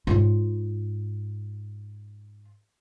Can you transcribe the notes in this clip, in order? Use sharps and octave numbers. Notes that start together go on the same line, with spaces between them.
G#2 F4